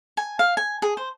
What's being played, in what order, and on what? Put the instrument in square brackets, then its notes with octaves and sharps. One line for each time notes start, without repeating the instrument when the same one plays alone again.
[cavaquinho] G#5
F5
G#5
G#4
C5